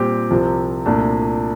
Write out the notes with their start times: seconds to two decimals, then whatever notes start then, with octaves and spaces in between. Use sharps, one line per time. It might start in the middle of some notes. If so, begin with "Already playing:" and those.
Already playing: A#2 G3 C4 G4
0.31 C2 C3 F3
0.86 C2 A#2 A3 D4